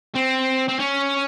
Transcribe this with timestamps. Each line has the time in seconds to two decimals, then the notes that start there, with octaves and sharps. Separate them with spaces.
0.15 C4
0.69 C4
0.80 C#4